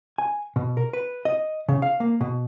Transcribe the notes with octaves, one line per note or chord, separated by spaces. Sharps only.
G#5
B2
A#4
B4
D#5
C#3
F5
A#3
B2